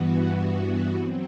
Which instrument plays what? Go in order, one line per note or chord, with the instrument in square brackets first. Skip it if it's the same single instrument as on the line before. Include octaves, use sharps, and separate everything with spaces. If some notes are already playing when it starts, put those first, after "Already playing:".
Already playing: [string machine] G2 E3 B3 F#4
F#3 C4